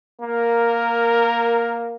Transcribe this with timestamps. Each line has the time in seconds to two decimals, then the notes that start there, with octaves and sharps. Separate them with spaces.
0.22 A#3 A#4